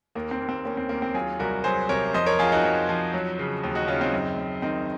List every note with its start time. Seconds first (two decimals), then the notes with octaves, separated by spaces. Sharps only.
0.15 D#2 A#3
0.31 C4
0.41 D#2
0.49 C4
0.65 D#2 A#3 C#4
0.77 C4
0.89 D#2 A#3
1.02 C4
1.14 F#3 F4 G#4
1.39 C2 F#4 A#4
1.64 F#3 G#4 C5
1.89 C3 A#4 C#5
2.14 F2 C5 D#5
2.26 A#4 C#5
2.39 F2 F4 G#4
2.52 D#4 F#4
2.64 F2
2.89 F3
3.14 F#3
3.39 C#3
3.64 D#2
3.75 D#4 F#4
3.88 C#3 C#4 F4
4.01 C4 D#4
4.13 F#2
4.38 F#2
4.62 D#3 C4 D#4